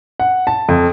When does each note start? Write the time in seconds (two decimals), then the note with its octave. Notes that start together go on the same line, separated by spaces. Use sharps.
0.20 F#5
0.47 A5
0.69 F2